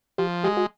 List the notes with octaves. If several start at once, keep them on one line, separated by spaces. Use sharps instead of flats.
F3 G4
G#3 G4
F#4